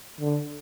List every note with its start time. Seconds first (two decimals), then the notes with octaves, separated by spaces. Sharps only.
0.20 D3